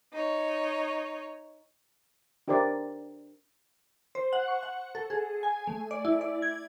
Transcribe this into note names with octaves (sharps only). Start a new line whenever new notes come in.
D#4 C#5
D4 G4 A#4 C5 D5
C5
F#5
C#6
F#5
A4
G#4
G#5
A3
D5
E4
D5
G#6